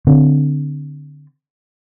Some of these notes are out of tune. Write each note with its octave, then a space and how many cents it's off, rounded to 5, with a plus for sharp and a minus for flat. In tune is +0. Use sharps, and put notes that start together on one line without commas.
D3 +0 C4 -20